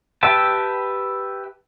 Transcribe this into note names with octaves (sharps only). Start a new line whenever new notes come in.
G4 B4 E5 G5 A5